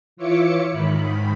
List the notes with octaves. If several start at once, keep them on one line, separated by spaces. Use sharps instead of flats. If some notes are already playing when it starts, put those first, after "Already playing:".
E3 F4 C#5 E5 D6 C#7
G#2 D#3 B5